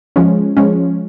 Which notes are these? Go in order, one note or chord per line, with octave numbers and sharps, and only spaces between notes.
F3 G#3 C#4
F3 G#3 C#4